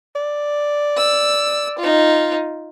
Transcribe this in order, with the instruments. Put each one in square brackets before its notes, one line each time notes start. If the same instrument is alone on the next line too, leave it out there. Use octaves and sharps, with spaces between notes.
[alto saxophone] D5
[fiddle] E6
D#4 F4